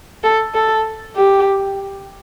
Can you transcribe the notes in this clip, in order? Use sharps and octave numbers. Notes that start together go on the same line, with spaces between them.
A4
A4
G4